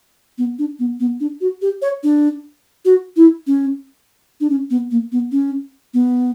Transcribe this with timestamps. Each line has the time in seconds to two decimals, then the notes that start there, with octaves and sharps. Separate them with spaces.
0.38 B3
0.59 D4
0.79 B3
1.00 B3
1.20 D4
1.41 F#4
1.62 G4
1.82 C#5
2.03 D4
2.85 F#4
3.16 E4
3.47 C#4
4.41 D4
4.50 C#4
4.70 B3
4.91 A#3
5.12 B3
5.32 C#4
5.94 B3